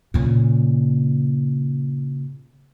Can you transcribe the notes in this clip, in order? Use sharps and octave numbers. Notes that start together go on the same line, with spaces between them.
A#2 C#3